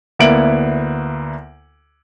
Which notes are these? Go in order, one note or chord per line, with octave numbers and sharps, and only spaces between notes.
D2 A#3 B3 E4 D7 F#7